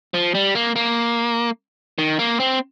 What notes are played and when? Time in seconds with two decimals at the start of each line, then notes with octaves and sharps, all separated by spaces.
0.14 F3
0.35 G3
0.55 A#3
0.76 A#3
1.98 D#3
2.19 A#3
2.40 C4